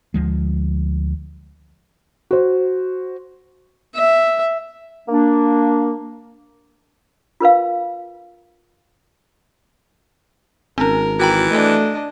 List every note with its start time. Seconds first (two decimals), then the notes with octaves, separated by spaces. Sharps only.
0.14 D2 F3 G#3
2.31 F#4 C5
3.95 E5
5.09 A#3 D4
7.40 F4 A#4 B4 F5
10.78 G#1 C4 C#4 A#4
11.19 E3 F#4 G5 A#5
11.51 A3 D4 D#5